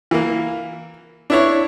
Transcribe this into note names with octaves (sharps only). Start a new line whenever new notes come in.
E3 A#3
D4 E4 C#5